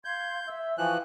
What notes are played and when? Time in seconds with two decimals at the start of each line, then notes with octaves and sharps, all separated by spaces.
0.05 F5 C6 G6 G#6
0.47 E5 E6
0.78 E3 F3 G5 G#5 C#6 F#6